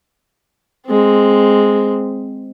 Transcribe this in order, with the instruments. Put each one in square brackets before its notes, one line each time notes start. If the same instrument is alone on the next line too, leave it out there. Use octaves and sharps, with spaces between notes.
[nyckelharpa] G#3 C4